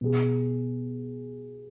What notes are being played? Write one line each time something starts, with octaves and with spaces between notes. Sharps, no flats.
B2 B3 G#4